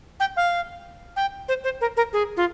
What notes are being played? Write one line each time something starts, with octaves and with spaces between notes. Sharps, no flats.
G5
F5
G5
C5
C5
A#4
A#4
G#4
F4